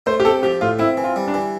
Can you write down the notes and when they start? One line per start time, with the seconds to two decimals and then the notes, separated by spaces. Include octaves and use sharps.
0.06 A3 C5
0.20 G4
0.25 C4 A4
0.43 F3 G4
0.61 A2 F4
0.79 C4 E4
0.97 E3
1.04 F4
1.16 G3
1.28 D4
1.34 E3